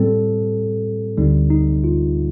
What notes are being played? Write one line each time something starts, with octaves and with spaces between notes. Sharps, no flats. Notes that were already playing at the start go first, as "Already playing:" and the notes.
Already playing: A2 G3 C4 A4
D2 D3 G3 C4 D#4
D#4
F4